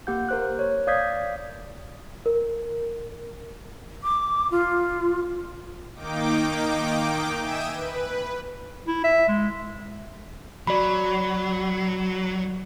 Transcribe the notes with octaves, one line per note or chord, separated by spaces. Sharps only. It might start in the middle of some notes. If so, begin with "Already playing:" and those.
A#3 G4 F#5 G6
A#4 C5 F#6
C#5
D5 F5 D#6 G6 G#6 B6
A#4
D6
F4
D#3 A#3 D#4 G5 D6
E5 G5 G#5 D#6 D7 E7
B4
E4
E5
G#3
F#3 D5 B5